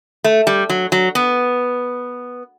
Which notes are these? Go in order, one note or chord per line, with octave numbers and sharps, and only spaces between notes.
A3
G3
F#3
F#3
B3